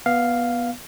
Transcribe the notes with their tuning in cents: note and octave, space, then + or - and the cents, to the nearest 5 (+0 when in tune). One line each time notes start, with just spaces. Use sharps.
B3 -15 F5 +0